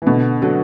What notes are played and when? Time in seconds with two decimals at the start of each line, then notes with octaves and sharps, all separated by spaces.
0.02 E3
0.07 B2 D3
0.42 D3 F#3